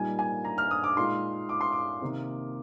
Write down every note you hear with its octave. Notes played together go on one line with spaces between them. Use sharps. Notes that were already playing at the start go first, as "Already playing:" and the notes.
Already playing: A#2 G3 A#3 D#4 G#5
G#5
A#5
F6
D#6
D6
A#2 G#3 D#4 C6
D6
C6
D6
C3 D#3 A#3